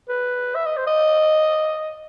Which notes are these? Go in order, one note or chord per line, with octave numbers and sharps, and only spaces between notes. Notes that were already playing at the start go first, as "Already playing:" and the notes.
B4
E5
D#5
C5
D#5